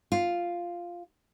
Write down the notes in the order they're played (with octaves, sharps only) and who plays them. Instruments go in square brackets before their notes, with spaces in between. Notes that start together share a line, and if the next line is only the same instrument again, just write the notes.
[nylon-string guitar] F4